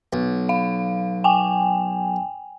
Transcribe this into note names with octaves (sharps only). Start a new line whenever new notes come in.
B1
F5
G5 G#5